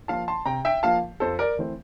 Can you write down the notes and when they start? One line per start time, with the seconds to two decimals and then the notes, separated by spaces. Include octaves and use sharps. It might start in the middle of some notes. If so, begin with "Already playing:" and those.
0.08 F3 A#3 F4 F5 A5
0.28 A5 C6
0.46 C3 G5 A#5
0.65 E5 G5
0.83 F3 A#3 F4 F5 A5
1.20 F2 A4 C5
1.39 A#4 D5
1.58 E3 A3 C4